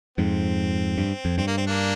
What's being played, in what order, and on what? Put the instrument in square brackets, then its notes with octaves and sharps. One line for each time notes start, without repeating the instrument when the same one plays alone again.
[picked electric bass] F2 G#2 [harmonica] C4
[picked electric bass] G2
F2
[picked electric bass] G2 [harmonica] C4
[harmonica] A#3
C4
A#3 D4